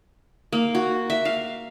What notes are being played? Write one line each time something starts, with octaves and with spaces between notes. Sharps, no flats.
A#3
F#4
E5
F5